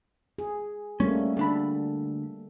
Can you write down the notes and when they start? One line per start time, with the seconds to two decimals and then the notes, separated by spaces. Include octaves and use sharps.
0.38 G#4
1.00 G3 A3 A#3 C#4
1.37 D2 D4 A4 B5